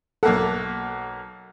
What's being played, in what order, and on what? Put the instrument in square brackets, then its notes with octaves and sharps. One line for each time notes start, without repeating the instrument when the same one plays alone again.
[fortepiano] B1 A#3 F#5 [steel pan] A4